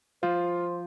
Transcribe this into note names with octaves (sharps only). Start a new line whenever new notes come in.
F3 F4 C5 C6